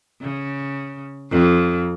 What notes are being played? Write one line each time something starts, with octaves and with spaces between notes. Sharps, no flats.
C#3
F2